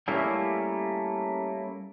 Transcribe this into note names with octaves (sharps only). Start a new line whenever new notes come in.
G3 A3 A#3 C#4 E4